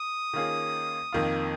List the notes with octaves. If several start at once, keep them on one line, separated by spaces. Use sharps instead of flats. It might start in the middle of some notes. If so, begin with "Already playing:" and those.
Already playing: D#6
D#3 A#3 C#4 F4 G#4
F2 D#3 A#3 F4